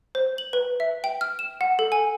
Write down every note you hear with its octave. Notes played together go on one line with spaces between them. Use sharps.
C5
F#7
B4
E5
G5
F6
E7
F#5
A4
G#5